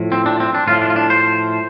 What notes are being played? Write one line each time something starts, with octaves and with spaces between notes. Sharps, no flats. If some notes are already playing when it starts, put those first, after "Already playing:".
Already playing: A2 F3
C4
D4
C4
D4
A2 F3 F4
D4
F4
D4
C5